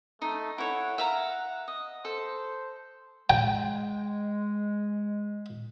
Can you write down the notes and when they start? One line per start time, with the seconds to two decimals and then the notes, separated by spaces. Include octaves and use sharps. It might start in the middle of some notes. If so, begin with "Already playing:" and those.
0.22 A3 D#4
0.58 E4 A4 C#5 F#5
0.98 E5 F5 A#5
1.68 D#5
2.05 A4 C5
3.30 G#3 G5